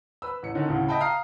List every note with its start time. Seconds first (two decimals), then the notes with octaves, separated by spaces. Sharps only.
0.22 B4 B5 E6
0.43 A1 C#7
0.55 D3 D#3 C#4
0.68 D2 A2 C#3
0.88 D#5 E5 G5 A5 B5
1.00 F5 A#5 D#6 F6 C7